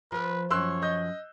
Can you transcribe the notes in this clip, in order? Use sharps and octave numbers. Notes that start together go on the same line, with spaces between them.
F3 A#4 B4
F#2 F3 A#4 C#5 C6 E6 F#6
D#5 G6